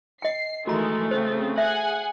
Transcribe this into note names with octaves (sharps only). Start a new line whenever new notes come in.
D#5 G5 C7
D#3 E3 G#3 A3 F#4 A#5
C#3 C4 C5
G#4 E5 F#5 G#5